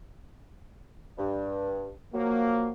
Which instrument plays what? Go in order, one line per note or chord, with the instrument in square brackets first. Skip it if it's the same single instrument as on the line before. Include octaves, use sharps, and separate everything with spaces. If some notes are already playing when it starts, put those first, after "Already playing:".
[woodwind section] G2
[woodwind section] F3 F#3 F#4 [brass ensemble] A#3